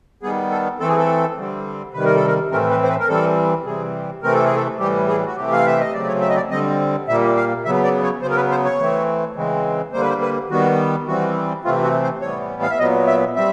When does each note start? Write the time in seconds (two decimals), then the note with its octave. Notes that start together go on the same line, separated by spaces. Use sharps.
0.23 D#3 G3 B3 G#4
0.51 A4
0.80 E3 A3 C4 A4
0.88 G#4
0.97 A4
1.37 D3 G3 C4
1.93 C3 D#3 G3 B4
2.05 A#4
2.15 A4
2.27 A#4
2.51 A2 E3 A3 C4 A#4
2.70 B4
2.83 C5
2.89 B4
3.00 A#4
3.08 E3 G3 C4 A4
3.65 C3 E3 G3 C4 G#4
4.22 C3 E3 A3 C4 A#4
4.34 A4
4.45 G#4
4.56 A4
4.79 A2 E3 G3 G4
5.08 G#4
5.26 F#4
5.36 C3 E3 A3 C4 G4
5.52 F5
5.66 E5
5.80 D#5
5.94 C#3 F#3 A3 C4 D5
6.08 C#5
6.21 E5
6.29 D#5
6.36 D5
6.51 D3 G3 C4 D#5
7.08 A#2 G3 A#3 E5
7.36 F5
7.65 C#3 F#3 B3 E5
7.84 D5
8.03 C#5
8.22 C#3 F#3 B3 C5
8.30 A#4
8.36 B4
8.51 C5
8.65 C#5
8.79 E3 A3 C4
9.36 C#3 E3 G#3 C4
9.93 D3 G3 A#3 C5
10.02 B4
10.09 C5
10.21 B4
10.50 D#3 G3 B3 F#4
11.07 E3 G3 C4 F#4
11.64 C3 E3 A3 C4 F4
11.83 F#4
12.03 C5
12.21 A2 E3 G3 B3 C#5
12.62 F5
12.70 E5
12.79 A#2 F#3 B3 D#5
13.07 E5
13.36 G3 C4 E5